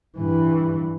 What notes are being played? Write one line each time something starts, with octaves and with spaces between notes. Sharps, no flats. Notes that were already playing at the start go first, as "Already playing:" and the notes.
G2 E3